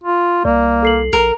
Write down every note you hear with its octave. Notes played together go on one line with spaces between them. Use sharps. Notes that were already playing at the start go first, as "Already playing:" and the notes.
F4
C2 A#3 D5
A4 C7 F#7
A#1 A#4